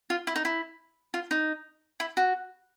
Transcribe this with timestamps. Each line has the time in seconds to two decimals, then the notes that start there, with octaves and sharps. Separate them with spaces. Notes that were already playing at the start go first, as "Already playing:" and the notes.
0.10 F4
0.27 E4
0.36 D#4
0.45 E4
1.14 F4
1.31 D#4
2.00 E4
2.17 F#4